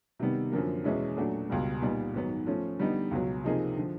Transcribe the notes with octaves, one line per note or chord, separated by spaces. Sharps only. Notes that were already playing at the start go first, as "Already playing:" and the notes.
C3 D#3 G3 B3
F#2 D3 F3 A#3
E2 B2 G#3 C#4 E4
A#2 F#3 A3 D4 F#4
C#2 B2 G3
A#2 G3 B3 D#4
G#2 D#3 F#3 B3
F3 A3 C#4
D3 G3 B3 D#4
C#2 B2 F#3
C3 F3 A#3 D#4 G#4
D3 F3